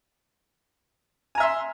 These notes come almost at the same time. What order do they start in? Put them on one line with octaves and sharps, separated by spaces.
G#5 A#5 E5 C6